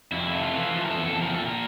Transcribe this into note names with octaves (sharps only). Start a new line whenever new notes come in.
F2 E4
A3
F4
E3
F3
A#4
A4
E2
A4
F3 A#4
A#2 A4
A#4